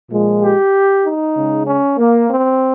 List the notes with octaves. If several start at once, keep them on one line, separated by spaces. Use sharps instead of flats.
A#2 F3 G#3
G4
D#4
C#3 G#3
C#4
A#3
C4